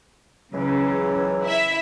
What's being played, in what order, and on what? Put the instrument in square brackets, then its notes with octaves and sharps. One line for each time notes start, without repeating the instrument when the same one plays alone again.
[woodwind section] C#2 E3 F#3 [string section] C#3
[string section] E4 E5